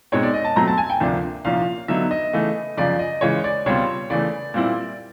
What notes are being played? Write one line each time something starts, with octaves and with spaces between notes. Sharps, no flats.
B2 G#3 C4 D#4 C#5
D5
D#5
A5
B2 F#3 A3 C4 A#5
A5
G#5
G5
D2 C3 F3 A#3 D4
C2 A#2 F3 A#3 C#4 F5
D3 F#3 B3 D#4 E5
D#5
C#3 E3 A3
F#2 C#3 F3 D5
D#5
C#3 E3 G#3 C#5
D5
C#2 B2 G3 C4 F4 C#5
C#3 E3 A3 D5
A#2 G3 C4 E4